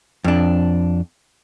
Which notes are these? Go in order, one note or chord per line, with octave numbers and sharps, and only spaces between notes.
F2 D4